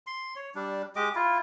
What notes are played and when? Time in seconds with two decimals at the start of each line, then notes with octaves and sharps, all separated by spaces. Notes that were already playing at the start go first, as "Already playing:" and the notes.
0.07 C6
0.36 C#5
0.55 G3 D4
0.96 G#3 G4 D#5 D6
1.15 E4 F4